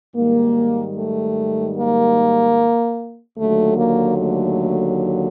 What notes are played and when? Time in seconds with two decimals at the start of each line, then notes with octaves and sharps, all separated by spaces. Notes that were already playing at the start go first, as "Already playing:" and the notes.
0.15 G#2 D#3 G3 A#3
0.96 A3
1.76 A#3
3.37 D#2 D3 F#3 A3
3.78 A#3
4.17 A3